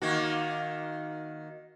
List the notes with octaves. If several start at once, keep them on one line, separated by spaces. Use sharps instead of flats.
D#3 A#3 F#4